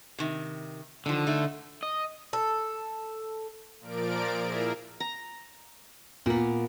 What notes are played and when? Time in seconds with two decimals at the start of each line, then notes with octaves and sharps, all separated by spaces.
0.18 C3 D#3
1.06 D3 D#3 F3
1.27 A3 D#4
1.83 D#5
2.33 A4
3.80 A#2 F3 A#4 D5 D7
4.41 A#3 E4 G#4 A#4 E5
5.00 A#5
6.26 A#2 A#3 B3